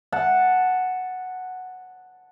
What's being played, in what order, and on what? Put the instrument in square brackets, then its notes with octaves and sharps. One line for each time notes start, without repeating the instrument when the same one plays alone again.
[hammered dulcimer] F#5 A5